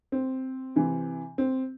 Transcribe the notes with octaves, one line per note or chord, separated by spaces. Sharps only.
C4
C3 E3
C4